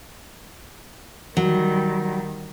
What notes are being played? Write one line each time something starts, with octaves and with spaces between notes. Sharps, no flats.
D#3 F#3 G3